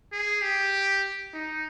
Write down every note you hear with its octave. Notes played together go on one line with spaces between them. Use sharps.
G#4
G4
D#4